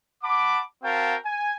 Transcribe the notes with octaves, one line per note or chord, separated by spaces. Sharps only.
F#5 A5 B5 D6
C4 F#4 A#4 F5 G5 A5
G#5